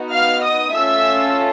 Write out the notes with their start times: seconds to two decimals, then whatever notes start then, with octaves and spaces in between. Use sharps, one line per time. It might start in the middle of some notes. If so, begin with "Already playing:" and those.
Already playing: B3 D#4 F#4
0.12 F5 F6
0.43 D#5 D#6
0.75 A3 C#4 F4 A4 E5 E6